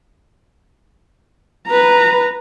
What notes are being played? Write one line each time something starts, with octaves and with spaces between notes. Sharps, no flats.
B4 A#5